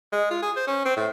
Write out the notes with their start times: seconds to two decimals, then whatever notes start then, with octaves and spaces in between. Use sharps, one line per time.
0.12 G#3
0.31 F4
0.42 G#4
0.56 C5
0.67 C#4
0.85 C4
0.97 A2